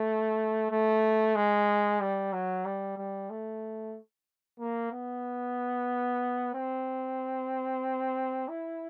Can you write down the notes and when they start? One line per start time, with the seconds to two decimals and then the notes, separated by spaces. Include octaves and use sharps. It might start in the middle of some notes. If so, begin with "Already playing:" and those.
Already playing: A3
0.71 A3
1.35 G#3
2.00 G3
2.32 F#3
2.65 G3
2.97 G3
3.30 A3
4.59 A#3
4.92 B3
6.54 C4
8.48 E4